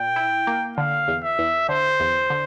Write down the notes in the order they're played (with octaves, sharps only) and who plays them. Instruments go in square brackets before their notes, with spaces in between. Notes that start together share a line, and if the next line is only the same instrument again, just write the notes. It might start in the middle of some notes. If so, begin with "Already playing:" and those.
Already playing: [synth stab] A#2 [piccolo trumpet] G5
[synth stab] E4
A#3
[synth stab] D3 [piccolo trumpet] F5
[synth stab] E2
[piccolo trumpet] E5
[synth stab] E2
[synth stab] D3 [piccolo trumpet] C5
[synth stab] E2
D3